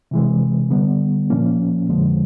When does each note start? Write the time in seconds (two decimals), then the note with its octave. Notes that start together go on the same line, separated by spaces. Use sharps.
0.11 C3 E3 G#3
0.70 D3 G3 B3
1.30 A#2 F3 A#3 C#4
1.89 F2 D3 F3 G#3